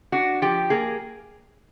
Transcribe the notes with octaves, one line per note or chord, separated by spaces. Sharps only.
D4 F#4
F3 G4
A#3 G#4